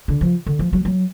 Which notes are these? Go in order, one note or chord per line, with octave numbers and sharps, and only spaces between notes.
D3
F3
D3
F3
F#3
F#3